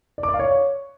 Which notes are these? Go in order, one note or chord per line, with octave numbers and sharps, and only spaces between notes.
D5
D6
D5
F5
C#5